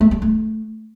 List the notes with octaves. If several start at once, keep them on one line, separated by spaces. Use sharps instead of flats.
A3
G3
A3